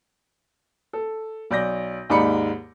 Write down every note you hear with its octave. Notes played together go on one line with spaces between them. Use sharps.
A4
B1 D5 G6 A#6
D#2 G#2 D#4 D5 B5 C#7